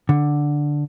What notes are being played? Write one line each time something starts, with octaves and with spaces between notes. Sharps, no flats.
D3